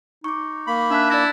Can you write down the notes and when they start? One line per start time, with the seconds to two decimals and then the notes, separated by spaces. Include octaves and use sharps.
0.24 D#4 C#6 D6
0.67 A#3 B5
0.90 D4 E5 A5 F#6
1.10 E4 D5 A6 A#6